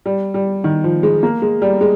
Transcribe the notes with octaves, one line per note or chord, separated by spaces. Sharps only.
G3
G3
D#3
F3
G#3
A#3
G#3
G3
G#3